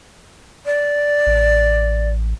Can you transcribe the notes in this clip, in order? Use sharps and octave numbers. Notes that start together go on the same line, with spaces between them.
D5
A1